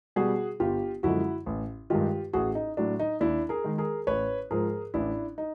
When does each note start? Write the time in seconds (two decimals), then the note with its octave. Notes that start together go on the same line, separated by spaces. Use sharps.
0.16 B2 G3 F#4 G#4
0.60 G1 F4 G4
1.03 F#2 D3 F3 G#3 E4 F#4
1.46 A1
1.90 G2 D#3 G#3 F4 G4
2.33 A1 F#4 G#4
2.55 D#4
2.77 A2 F#3 D4
3.00 D#4
3.20 D#2 D4 E4
3.49 G#4 A#4
3.64 D#3 G#3
3.78 G#4 A#4
4.07 A1 B4 C#5
4.51 G#2 F3 G#4 A#4
4.94 A1 D4 E4
5.38 D#4